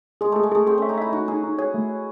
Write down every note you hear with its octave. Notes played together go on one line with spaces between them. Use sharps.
G#3 G#4
A3 G#4
G#3
A3 G#4
C4 G#4
C#4 E5
D#4
E4 E5
D#4 F#4
D#4 G#4
D#4
G#4 C#5
A3
C#5